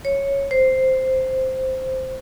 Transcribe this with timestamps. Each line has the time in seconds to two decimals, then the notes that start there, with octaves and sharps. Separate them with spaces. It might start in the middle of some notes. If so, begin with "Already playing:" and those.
0.05 C#5
0.51 C5